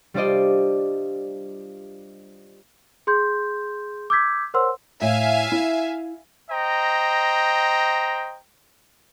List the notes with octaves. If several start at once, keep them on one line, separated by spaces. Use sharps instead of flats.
G3 D4 F4 C5 D5 D#5
G#4 C6 G6
D6 E6 G6 G#6 B6
A#4 C5 C#5 F#5 C6 E6
A2 E5 F5 G#5
E4
C5 D#5 G5 A#5